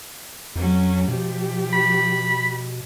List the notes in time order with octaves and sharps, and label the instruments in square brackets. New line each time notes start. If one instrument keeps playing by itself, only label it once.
[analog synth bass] F2 [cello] F#3 C#4
[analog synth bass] B2 [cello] F3 G4
[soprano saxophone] B5